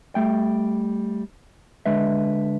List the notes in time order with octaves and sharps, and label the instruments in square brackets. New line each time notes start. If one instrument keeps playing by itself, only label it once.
[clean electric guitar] G3 A3 G5
D3 G#3 B4 E5